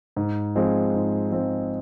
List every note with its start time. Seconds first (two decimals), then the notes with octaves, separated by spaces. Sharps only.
0.16 G#2
0.55 F3 G#3 C4
0.94 G#2
1.31 F3 G#3 C4